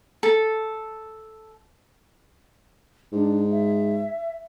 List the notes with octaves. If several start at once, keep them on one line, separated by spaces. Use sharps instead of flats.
A4
G#2 D4
E5